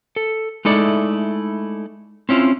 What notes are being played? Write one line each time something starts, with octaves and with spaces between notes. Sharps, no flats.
A4
G#3 A3 D#4 E4 A4 D5
C4 C#4 E4 F4